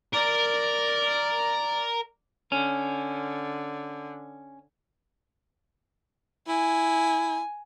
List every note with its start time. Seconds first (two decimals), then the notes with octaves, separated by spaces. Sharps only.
0.14 A#4 D5
2.52 D3 C#4
6.48 E4 G#5